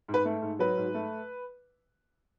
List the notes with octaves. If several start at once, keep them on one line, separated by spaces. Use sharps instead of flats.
G#2
B4
A3
G#2
F#3 B4
G#2
A3